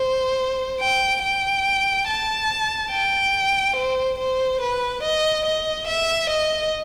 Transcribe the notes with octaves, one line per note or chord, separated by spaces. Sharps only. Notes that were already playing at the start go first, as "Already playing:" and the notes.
Already playing: C5
G5
G5
A5
G5
C5
C5
B4
D#5
D#5
E5
D#5